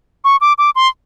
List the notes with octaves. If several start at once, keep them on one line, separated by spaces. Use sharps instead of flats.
C#6
D6
D6
C6